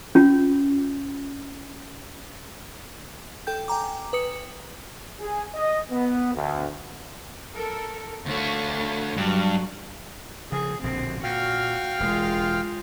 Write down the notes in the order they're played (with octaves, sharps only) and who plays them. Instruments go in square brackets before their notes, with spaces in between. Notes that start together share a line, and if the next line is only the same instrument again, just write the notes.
[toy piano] C#4 F4
[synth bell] A4 G5 G6
G5 G#5 A#5 D6
B4 D#6 C#7
[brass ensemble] G#4
D#5
B3
D2
[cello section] A4 A#4
[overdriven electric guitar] D2 A3 [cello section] D3 C#5 F5
[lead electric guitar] G2 [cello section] F#3
[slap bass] C#3 F3 [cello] G#4
[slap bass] A#1 B2 D3 [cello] C4
[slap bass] A#2 [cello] F#4 [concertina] F5 G5 F6
[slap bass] E1 [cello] G#3 F4